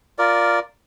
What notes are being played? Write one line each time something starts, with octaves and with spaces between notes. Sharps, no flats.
F4 A#4 D5